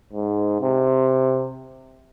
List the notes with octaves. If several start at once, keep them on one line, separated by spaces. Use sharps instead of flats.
G#2
C3